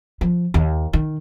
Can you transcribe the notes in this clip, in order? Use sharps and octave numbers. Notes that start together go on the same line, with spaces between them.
F3
D#2
D#3